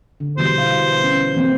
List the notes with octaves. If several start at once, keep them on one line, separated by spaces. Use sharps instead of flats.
D3
B2 E3 G3 C5
F5
C#4
E3 A#3 C4